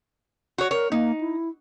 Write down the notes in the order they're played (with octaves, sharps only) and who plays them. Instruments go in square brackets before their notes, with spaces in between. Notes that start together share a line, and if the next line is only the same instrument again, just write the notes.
[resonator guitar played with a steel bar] F#4 C#5
[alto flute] A#4 [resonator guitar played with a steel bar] C#5
[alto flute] A#3 [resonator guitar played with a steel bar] D#4
[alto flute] E4